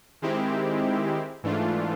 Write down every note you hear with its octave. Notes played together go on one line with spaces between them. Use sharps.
D#3 G#3 C4 E4 G4
G#2 E3 A3 D4 F4